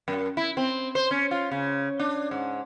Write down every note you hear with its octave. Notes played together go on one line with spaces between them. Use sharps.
F#2
E4
C4
C5
C#4
F4
C#3
D4
G#2